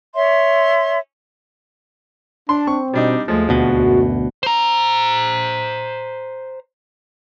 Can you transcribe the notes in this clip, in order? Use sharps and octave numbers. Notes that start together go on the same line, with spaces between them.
C#5 E5 C6
D4 A5 C6
C4 C#6
B2 G3 D4 D#4
D#2 F3 G#3 A3
D2 B2 F#4
F#2
C5 A#5